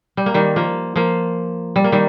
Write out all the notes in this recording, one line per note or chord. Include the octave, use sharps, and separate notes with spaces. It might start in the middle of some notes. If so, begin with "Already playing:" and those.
G3
A#3
D#3 G3
F3 A#3
F3 A#3
G3
A#3
D#3 G3